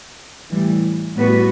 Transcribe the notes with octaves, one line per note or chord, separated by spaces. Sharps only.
A2 E3 G3
A2 G3 B3 F#4 B4